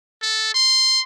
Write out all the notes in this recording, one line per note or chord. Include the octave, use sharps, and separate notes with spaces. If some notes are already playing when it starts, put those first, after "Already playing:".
A4
C6